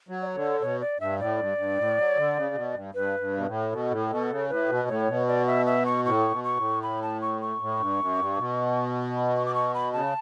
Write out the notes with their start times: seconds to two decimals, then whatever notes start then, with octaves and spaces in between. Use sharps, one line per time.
0.09 F#3
0.22 D5
0.26 C#5
0.35 D3
0.61 B2 C#5
0.81 D5
1.00 G2 E5
1.20 A2 D5
1.39 G2
1.58 G2
1.78 A2
1.98 F#3
2.17 D3
2.36 C#3
2.55 B2
2.75 G2
2.94 G2 B4
3.20 G2
3.37 B2
3.46 A2
3.72 B2 A4
3.91 A2
4.10 B2 A4
4.30 C#3
4.49 A2 B4
4.69 B2
4.88 A2 C#5
5.08 B2
5.28 D5
5.47 E5
5.66 E5
5.86 C#6
6.05 A2 C#6
6.31 B2
6.44 C#6
6.57 A2
6.83 B5
7.02 A5
7.21 C#6
7.41 C#6
7.61 A2
7.79 G2
8.00 F#2
8.18 G2
8.38 B2
9.17 B5
9.35 C#6
9.46 D6
9.55 C#6
9.74 B5
9.93 C#3 A5